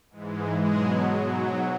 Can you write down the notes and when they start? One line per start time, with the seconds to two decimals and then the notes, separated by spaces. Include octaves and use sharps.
0.10 G#2 E3 G#3
0.62 B2 F#3 G#3 G#4
1.15 G#2 F#3